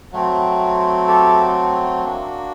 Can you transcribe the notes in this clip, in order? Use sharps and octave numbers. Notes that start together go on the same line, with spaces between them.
F#3 A3 C4
G4 A4
A#3 D4 F#4